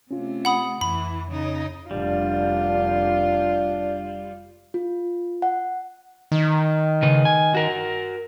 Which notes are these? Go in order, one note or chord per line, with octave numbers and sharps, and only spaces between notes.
C3 A3 C#4 F4
F#5 B5 D#6
F2 E3 B5
C#3 D#4
F1 G3 D4 F4
F4
F#5
D#3
C#3 B4
G#5
F#4 A#4